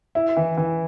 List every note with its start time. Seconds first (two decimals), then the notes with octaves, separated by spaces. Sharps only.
0.15 E4
0.37 E3
0.57 E3